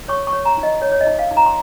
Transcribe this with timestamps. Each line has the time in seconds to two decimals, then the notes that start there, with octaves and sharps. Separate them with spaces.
0.08 C#5 C#6
0.27 C#6
0.33 C#5
0.45 A#5
0.57 D#4
0.63 D#5
0.82 C#5
0.92 C#5
1.01 D#5
1.06 D#4
1.19 F5
1.31 D#4
1.37 A#5
1.46 C6